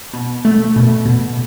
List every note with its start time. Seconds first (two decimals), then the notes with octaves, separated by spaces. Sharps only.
0.13 B2
0.45 A3
0.76 B2
1.06 B2